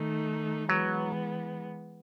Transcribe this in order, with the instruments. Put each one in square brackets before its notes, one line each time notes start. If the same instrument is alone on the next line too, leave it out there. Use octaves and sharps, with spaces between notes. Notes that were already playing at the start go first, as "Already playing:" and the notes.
Already playing: [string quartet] D#3 A3 D#4
[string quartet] E3 G#3 B3 [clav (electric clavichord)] F#3